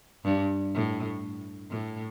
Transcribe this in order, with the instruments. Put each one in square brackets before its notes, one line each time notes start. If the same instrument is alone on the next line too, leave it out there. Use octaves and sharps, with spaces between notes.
[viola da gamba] G2
A2
A2